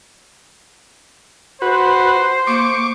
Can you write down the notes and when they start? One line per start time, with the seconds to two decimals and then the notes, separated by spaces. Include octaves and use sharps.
1.62 F#4 B4 C5
2.47 A#3 C#6 D6